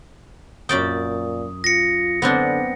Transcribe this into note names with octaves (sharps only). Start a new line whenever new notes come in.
F#2 A#2 D5 G5 D#6
F4 A#6 C#7
D3 B3 C4 D4